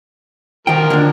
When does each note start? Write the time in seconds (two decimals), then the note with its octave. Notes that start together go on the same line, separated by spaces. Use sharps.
0.67 D#3 F3 A#4 G5
0.90 D3 D4